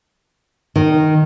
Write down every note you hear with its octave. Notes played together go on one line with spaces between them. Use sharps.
D#3